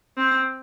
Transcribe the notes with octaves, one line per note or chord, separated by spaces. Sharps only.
C4